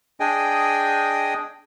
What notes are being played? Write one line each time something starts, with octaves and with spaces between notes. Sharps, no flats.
D4 G#4 D#5 G5 G#5